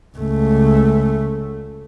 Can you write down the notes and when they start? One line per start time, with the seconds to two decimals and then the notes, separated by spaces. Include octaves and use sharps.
0.17 C#2 A3